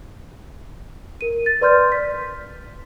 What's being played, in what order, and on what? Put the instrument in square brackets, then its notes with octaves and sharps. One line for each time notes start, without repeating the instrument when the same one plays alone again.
[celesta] A#4 D#7
A6
B4 D5 C6 F6 G6
B6